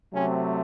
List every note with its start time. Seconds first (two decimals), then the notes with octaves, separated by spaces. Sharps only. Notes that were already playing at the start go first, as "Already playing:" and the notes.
0.13 C3 F#3 A3 C4 C#4